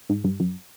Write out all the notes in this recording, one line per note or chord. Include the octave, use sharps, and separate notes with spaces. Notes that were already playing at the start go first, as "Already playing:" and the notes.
G#2
G2
F#2